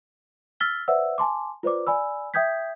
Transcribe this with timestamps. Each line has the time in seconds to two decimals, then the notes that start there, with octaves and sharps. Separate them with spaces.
0.60 E6 F6 A6 B6 G7
0.88 B4 C5 D5 E5 F#5 E6
1.18 G#5 A5 C6 D6
1.63 F4 B4 C5 D5 D6
1.87 D5 G#5 B5 E6
2.34 E5 G5 D#6 G6 G#6 B6